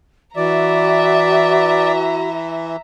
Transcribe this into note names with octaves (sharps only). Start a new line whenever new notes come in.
E3 F#4 D5 E5 A#5